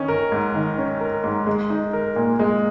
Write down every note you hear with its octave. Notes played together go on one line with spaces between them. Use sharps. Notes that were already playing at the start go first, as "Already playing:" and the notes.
Already playing: D#3 C#4
A#4
G#2
D#3
C#4
A#4
G#2
G#3
D#4
A#4
A#2
G#3